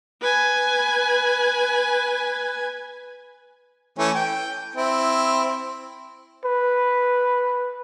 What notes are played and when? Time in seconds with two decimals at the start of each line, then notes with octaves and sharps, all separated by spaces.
0.21 B4 G#5
3.99 E3 A3 C#4
4.15 G5
4.75 C4 E4
6.45 B4